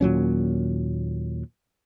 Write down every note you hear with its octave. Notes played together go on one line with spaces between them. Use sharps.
D#2 A#2 F#3 C#4